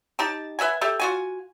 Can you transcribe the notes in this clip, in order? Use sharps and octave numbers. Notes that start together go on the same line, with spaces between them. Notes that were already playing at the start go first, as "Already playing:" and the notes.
D#4 G4 A5
B4 E5 F#5 G#5
G4 A4 E5
F4 F#4 G#5